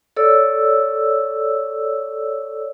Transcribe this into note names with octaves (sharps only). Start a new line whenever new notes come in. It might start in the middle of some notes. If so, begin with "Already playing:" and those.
A4 C#5 D5 E6